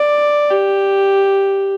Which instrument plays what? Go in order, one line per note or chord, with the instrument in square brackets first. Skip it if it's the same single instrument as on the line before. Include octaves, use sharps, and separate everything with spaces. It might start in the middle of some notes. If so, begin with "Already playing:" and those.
Already playing: [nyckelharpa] D5
G4